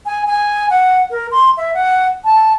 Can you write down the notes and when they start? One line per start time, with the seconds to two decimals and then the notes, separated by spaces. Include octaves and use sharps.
0.06 G#5
0.27 G#5
0.70 F#5
1.11 A#4
1.31 C6
1.57 E5
1.74 F#5
2.25 A5